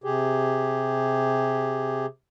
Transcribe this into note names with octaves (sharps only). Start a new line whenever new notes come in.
C3 G4 G#4